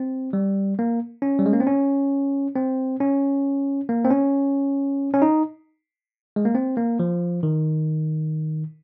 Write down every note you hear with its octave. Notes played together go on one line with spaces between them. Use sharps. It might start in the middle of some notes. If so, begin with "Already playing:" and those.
Already playing: C4
G3
A#3
C#4
G3
G#3
A#3
C4
C#4
C4
C#4
A#3
C4
C#4
C#4
D#4
G#3
A#3
C4
A#3
F3
D#3